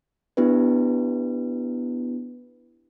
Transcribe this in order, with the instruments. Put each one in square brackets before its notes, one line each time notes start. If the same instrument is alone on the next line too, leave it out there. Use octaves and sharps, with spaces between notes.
[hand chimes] B3 D4 E4 G4 B4